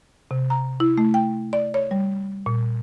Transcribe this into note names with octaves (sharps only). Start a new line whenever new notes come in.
C3
A#5
E4
A3
G5
D5
C#5
G3
A#2